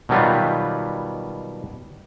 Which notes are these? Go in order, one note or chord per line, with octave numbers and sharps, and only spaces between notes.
B2 D#3 F#3 G3 B3 F4